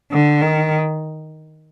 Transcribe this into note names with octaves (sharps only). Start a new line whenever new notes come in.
D3
D#3